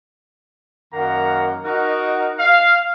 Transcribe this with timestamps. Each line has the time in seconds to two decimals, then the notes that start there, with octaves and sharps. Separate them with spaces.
0.93 F#2 D#3 A#3 F5 F#5 A#5
1.64 D#4 F#4 A#4
2.39 F5